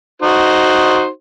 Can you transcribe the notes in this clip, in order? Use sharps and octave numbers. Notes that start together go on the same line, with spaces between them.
D#4 F#4 C5